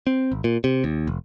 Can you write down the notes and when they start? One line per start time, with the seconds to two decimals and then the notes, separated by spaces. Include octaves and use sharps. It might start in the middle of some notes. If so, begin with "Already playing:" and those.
0.07 C4
0.32 G#1
0.44 A#2
0.64 C3
0.84 D#2
1.07 F1